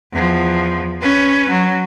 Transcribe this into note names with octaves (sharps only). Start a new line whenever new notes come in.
E2 F3
C#4 B4
F#3